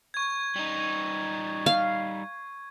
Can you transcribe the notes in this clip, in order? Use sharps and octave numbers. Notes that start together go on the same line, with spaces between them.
C#6 G#6
G3 D#4
F5